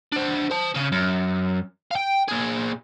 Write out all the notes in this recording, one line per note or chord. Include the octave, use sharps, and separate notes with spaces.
D4 C5
C5 A5
C#3 C#4
F#2
F5 G5
A#2 G#4